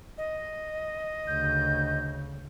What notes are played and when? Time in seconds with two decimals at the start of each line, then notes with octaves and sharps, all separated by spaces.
0.18 D#5
1.27 D2 C#3 G6